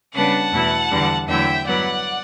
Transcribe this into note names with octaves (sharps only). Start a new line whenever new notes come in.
C#3 G3 B3 D4 F#5 A5
E2 B2 A3 E4
E2 D3 G3
E2 D3 F#3 A3 E4 E5 G5
G2 F#3 B3 E4 D5 F#5